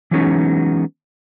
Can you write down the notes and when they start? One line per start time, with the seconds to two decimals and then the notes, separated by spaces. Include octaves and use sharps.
0.11 E3 F#3 G#3 B3 C#4 D#4